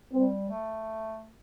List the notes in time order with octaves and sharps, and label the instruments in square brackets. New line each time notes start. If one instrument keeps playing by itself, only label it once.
[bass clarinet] G3 [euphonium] C4
[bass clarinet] A3